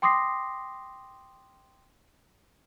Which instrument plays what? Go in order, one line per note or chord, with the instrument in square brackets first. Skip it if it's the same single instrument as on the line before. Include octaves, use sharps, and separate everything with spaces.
[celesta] G5 C6 D6 D#6 A#6 C7